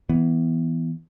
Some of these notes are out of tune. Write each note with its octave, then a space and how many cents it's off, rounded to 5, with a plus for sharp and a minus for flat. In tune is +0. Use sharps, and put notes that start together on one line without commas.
E3 +0 B3 +0